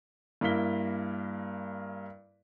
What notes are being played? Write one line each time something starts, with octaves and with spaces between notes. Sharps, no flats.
G2 A#3 E4 A#4 B6 G7